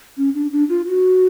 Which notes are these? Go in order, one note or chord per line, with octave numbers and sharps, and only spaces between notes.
C#4
D4
D4
F4
F#4